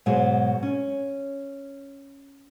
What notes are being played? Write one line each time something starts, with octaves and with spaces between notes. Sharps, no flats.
G#2 B2 F#3 G#3
C#4